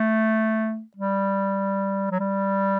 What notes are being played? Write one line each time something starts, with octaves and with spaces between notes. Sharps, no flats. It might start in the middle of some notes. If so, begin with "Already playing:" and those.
Already playing: A3
G3
F#3
G3